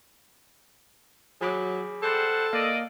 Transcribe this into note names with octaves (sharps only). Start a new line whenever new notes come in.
F#3 G#4 B5 D6
G3 A4 C5 F#5
A#3 D5 D#5 F5